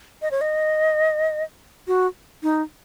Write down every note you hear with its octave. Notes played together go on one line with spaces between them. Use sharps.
D#5
C#5
D#5
F#4
D#4